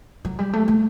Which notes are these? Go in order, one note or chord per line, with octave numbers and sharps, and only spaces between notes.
F#3
G3
A3
A3